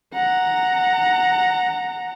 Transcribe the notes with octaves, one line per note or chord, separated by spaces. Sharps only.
F#5 A#5